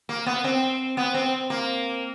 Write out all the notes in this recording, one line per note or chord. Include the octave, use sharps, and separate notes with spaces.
A#3
B3
C4
B3
C4
A#3